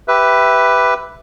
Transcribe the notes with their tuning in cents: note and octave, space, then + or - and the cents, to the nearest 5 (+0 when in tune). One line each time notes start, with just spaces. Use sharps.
G4 +0 B4 +5 E5 +0